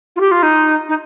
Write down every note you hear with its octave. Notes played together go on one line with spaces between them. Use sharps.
F4
G4
F4
D#4
D#4